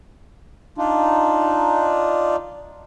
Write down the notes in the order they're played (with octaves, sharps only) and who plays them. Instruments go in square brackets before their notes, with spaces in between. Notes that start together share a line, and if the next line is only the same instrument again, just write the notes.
[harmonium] D4 D#4 F4